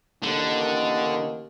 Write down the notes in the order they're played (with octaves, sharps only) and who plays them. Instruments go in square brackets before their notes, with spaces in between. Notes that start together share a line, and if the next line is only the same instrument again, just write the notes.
[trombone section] A1 D#2 D#3 [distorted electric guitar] D3